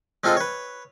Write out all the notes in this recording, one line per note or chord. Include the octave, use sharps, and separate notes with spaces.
G#3 C4 F4 A4 D#5
B4 C#5